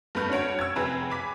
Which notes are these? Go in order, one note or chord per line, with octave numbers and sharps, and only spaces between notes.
G2 A3 B4 F6 G6
C#4 D4 F#4 C#5 D7
E6 G#6
F1 C4 G#4 B4 A#5
G#5 B5 D6 B6